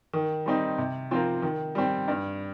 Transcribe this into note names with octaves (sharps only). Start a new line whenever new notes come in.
D#3
G3 C4 D#4
C3
F3 C4 F4 A#4
D#3
G3 C4
G2